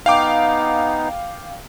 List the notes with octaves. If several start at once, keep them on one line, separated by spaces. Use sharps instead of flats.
B3 D#4 F5 G5 D6